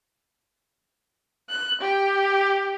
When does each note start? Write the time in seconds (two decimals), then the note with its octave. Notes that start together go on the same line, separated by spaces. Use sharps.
1.50 F#6
1.81 G4